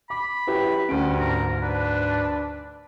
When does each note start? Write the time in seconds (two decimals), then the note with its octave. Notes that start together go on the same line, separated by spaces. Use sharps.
0.10 B5 D6
0.47 F#2 E4 G4 B4
0.89 D2 G2 C#4 D7
1.20 G#2 A#4
1.63 D4 B4